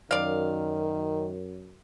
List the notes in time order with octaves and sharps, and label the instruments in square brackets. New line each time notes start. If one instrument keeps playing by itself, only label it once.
[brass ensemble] F#2 [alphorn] D#3 [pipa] D5 F5